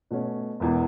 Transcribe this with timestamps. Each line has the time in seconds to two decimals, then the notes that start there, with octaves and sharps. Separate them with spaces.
0.11 B2 A3 C#4
0.60 E1 E2 E3